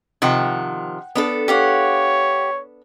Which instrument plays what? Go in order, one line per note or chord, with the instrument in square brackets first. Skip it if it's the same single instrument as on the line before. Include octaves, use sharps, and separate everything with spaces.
[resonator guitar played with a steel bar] C3 D#3 F3 [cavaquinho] F#5 G5
[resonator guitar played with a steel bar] B3 D4 A4
[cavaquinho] G4 F5 F#5 [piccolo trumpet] C#5